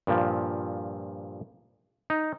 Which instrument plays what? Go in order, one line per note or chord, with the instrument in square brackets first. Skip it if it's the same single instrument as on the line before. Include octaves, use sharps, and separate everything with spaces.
[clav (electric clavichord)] G2 A#2 F3
D#4